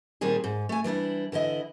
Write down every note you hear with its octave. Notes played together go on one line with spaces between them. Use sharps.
A#2 D#3 G3 C4 G#4
G#2
A3 G#5
E3 G3 D4 E4
D3 E3 E4 D#5